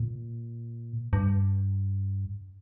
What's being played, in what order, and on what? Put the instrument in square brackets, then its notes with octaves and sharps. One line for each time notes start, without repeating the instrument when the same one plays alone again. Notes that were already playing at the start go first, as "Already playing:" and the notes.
Already playing: [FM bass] A#2
G2